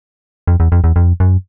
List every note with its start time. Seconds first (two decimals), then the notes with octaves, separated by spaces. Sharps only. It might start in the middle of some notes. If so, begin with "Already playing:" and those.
0.48 F2
0.60 E2
0.72 F2
0.84 E2
0.96 F2
1.20 F#2